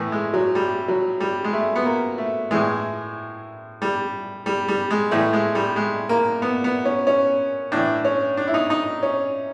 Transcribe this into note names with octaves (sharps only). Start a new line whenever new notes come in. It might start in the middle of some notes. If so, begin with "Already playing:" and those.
Already playing: A2 E3 A3
G#3
F#3
G3
F#3
G3
G#3
A3
B3
A#3
A3
A2 E3 G#3
G3
G3
G3
G#3
A2 E3 A3
G#3
G3
G#3
A#3
B3
B3
C#4
C#4
A2 E3 D4
C#4
D4
E4
D#4
D#4
C#4